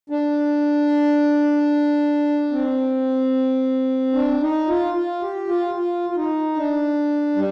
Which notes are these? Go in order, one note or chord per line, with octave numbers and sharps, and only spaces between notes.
D4
C4
D4
D#4
F4
F4
G4
F4
F4
F4
D#4
D4
G3